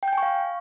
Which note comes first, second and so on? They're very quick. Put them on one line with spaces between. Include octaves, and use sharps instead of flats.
G5 G6 G#5 C#6 F5